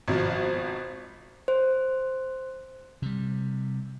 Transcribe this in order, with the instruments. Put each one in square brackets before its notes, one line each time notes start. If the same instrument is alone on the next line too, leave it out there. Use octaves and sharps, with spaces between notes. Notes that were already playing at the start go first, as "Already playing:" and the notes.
[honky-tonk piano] G#1 B2 F3
[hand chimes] C5
[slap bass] C3 G3